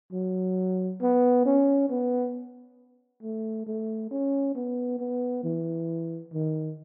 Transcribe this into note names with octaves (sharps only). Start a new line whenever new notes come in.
F#3
B3
C#4
B3
A3
A3
C#4
B3
B3
E3
D#3